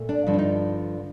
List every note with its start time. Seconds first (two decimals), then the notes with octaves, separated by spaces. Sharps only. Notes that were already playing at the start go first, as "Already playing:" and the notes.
Already playing: A#2 A3
0.09 D4
0.27 G2 D3 F3
0.34 D4
0.39 D#4